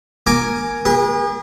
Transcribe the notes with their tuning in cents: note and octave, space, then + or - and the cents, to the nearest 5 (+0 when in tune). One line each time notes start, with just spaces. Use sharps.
A#4 +0 G#5 +0 D6 +0
G#4 -40 B4 -40